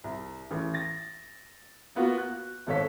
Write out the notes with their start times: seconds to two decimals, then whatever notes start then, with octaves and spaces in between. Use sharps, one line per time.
0.04 C2
0.51 A1
0.74 A6 A#6
1.95 A#3 B3 F4 F#4
2.18 F#6
2.67 G#1 B2 A4 C#5 F5 B6